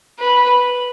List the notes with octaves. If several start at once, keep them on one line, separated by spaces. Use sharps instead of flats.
B4